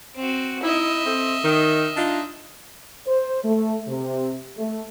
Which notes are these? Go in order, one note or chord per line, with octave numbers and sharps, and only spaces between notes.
C4 F#4
D#4 E4 D#5 E5
C4 A4
D#3
D4 D#4 F4
C5
A3
C3
A3